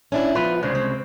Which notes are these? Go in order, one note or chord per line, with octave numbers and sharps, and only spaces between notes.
C#4 D4 E4 E5
F3 B3 F4 B4
C2 C#3 G#3 D4 C5
C4